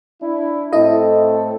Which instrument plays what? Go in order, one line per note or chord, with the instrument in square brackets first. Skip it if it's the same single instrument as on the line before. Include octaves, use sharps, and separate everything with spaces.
[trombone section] D4 E4
[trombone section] A2 C4 A4 [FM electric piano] E4 D#5